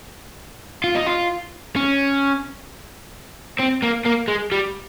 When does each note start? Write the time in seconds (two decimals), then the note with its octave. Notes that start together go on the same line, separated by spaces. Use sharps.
0.84 F4
0.95 D#4
1.07 F4
1.76 C#4
3.59 C4
3.82 A#3
4.05 A#3
4.28 G#3
4.52 G3